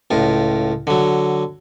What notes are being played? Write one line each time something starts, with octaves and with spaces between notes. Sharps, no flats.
C#2 A2 F4
D3 F#3